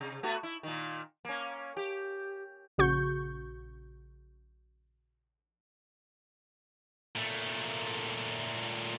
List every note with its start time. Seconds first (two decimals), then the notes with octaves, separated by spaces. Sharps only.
0.01 C3
0.23 A3 B3 F#4
0.43 E4
0.63 A#2 D#3
1.25 A#3 C#4
1.77 G4
2.78 A#1 C#3 F#4 C#6 G6
7.15 A#2 A3